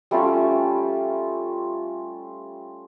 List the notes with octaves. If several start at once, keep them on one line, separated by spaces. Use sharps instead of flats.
G3 A3 C#4 F4